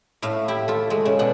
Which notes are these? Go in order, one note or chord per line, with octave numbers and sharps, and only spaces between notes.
A2 A3 F5
E4 G4
A3 F4
G#3 A3
C#3
B2 D4 F#5